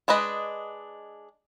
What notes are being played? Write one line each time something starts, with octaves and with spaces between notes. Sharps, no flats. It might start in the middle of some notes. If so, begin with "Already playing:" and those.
G#3 D4 B4 D#5